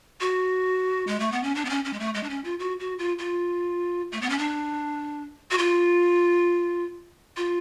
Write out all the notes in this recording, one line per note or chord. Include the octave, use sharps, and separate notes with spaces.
F#4
G#3
A3
B3
C#4
D4
B3
C#4
C#4
G#3
A3
G#3
D4
C#4
F4
F#4
F#4
F4
F4
A3
B3
C#4
D4
F#4
F4
F4